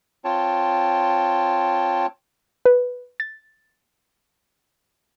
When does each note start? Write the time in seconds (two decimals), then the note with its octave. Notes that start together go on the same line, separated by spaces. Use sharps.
0.25 C4 F4 C#5 G5 A5
2.65 B4
3.20 A6